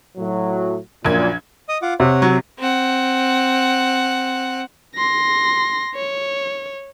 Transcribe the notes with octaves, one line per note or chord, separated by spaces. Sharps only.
A2 F#3
A#1 F#2 A#2 G#6
D#5 D#6
F4 F#5 D6
C3 C#5 F#5
F#3
C4 F#5
C6 A#6
C#5